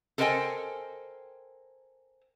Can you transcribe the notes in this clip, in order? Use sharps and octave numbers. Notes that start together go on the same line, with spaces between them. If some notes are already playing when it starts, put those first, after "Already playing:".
A4 A#4 C5 D#5 G5 G#5